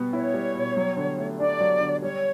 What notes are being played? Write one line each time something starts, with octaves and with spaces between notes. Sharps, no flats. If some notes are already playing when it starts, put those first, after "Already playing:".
Already playing: B2 G3 B3
E4 C#5
G3
B2
F#3
D3
A3
D4 D5
F#3
D3
G3 C#5